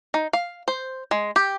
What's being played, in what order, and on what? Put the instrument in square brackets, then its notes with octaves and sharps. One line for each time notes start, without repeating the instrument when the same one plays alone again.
[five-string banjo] D#4
F5
C5
G#3
G4